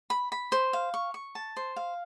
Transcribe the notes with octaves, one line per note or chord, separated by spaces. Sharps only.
B5
B5
C5
F5
C#6
C#6
A5
C5
F5